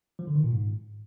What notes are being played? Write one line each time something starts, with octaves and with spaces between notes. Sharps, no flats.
F3
D3
D#3
A#2
G#2